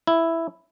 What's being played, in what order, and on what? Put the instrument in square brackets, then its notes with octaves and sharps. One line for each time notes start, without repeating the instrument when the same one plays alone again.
[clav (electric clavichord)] E4